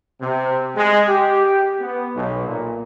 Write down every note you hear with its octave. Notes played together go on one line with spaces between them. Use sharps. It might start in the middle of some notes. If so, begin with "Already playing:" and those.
C3
G#3
G4
B3
B1
A#2